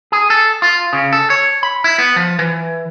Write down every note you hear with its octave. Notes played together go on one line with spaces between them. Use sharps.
G#4
A4
F4
C#3
A4
C#5
B5
E4
B3
F3
E3